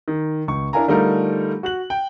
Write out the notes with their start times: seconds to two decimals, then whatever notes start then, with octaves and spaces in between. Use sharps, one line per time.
0.08 D#3
0.48 C#2 C#6
0.73 D4 E4 A#4 F5 G#5 A#5
0.88 D3 G3 A3 D#4 F4 A#4
1.63 F#4 F#6 F#7
1.90 G5